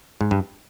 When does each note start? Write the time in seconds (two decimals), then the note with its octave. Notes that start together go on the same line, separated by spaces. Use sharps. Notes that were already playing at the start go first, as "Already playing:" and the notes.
0.21 G#2
0.31 G2